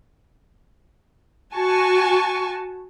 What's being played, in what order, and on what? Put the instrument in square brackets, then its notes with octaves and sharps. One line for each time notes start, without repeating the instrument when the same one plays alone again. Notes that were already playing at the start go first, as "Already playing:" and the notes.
[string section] F#4 G#5 A5 C#6